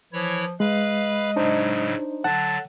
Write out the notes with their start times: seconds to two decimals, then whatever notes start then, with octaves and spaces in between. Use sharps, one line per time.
0.13 E3 F3 E4 C#5
0.60 G#3 B4 D#5 F5 B5
1.36 A2 C#3 F#3 D4 D#4 C5
2.24 D3 F#3 F#5 A5